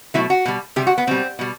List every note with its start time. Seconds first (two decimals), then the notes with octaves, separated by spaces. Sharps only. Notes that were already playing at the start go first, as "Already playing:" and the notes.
0.14 B2 F#3 A3 E4
0.30 F#4
0.45 B2 G3
0.76 C3 G3 G4
0.87 F#4
0.98 B3
1.07 B2 G3 C4
1.39 B2 G3